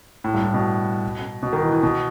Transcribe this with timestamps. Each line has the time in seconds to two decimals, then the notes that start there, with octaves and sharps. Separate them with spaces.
0.24 A2
0.34 G2
0.44 A2
0.54 B2
1.43 B2
1.53 D#3
1.62 E3
1.72 E3
1.83 B2